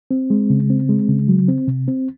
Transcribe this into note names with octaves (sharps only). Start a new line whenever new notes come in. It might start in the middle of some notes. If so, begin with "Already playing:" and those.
C4
G#3
C#3
C4
G#3
C#3
F#3
C4
C3
C4